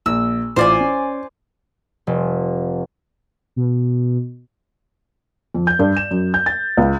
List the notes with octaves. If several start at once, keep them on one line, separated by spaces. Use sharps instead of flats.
A#1 E6
A1 E4 F4 C5 D5 G#5
C#4
F1
B2
F2
G6
G2
E7
F#2
G6
A6
C#2